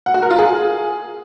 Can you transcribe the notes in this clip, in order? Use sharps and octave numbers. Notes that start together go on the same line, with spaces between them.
F#5
F#4
A#4
F4
G#4